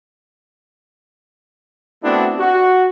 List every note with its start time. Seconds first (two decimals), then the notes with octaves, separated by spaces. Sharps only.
2.03 A3 B3 C4 D4 E4 F#4
2.39 F#4